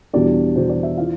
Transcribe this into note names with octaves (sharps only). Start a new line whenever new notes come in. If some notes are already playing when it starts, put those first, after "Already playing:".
E2 B2 G3 D4 D5
E2 B2 G3 C5
D5
E5
E3 F4 F5